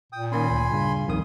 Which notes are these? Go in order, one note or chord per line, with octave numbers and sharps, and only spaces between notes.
A#2 G5 D#6
D#3 A#3 C#4 G#5 B5 C6
D2
G2 C#3
C2 F2 D#3 D#6